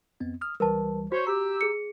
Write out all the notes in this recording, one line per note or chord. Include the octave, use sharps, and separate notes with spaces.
F2 B3 C4
D#6 F6
C#2 E3 G3 A#4 B4 A5
F#4 C5 C#5
G4 A#5 E6
G#4 C#7